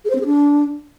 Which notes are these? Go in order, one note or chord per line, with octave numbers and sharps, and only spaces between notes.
G#4
C5
C4
G#4
D4